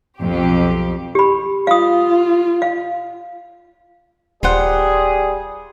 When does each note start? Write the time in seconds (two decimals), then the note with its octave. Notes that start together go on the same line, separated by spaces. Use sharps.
0.21 B1 F2 G4
1.15 G4 B5
1.67 F4 F5 D#6
2.62 F5
4.43 D#1 G3 F4 G#4 C5 F#5